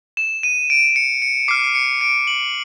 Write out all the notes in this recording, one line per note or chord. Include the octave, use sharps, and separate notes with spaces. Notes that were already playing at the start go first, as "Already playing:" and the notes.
E7
D#7
D7
C#7
C#7
D6 F6 C7
C#7
D7
F#7